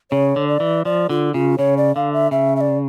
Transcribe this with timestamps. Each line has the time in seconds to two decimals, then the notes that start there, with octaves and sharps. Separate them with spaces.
0.11 C#3 C#5
0.36 D3
0.48 D5
0.60 E3
0.85 F3 D5
1.09 D3 F4
1.34 C#3 F4
1.58 C#3 C#5
1.77 D5
1.96 D3 F5
2.13 E5
2.31 C#3 E5
2.56 E5
2.61 D5